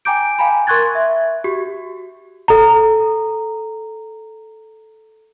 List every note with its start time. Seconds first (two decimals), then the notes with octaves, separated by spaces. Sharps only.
0.05 G5 G#5 A#5 D6 G6 D7
0.39 F5 G5 G#5 A#5 B5
0.67 A#4 C6 C#6 F#6 G#6 A6
0.95 E5
1.44 F#4 G4
2.48 A4 A#5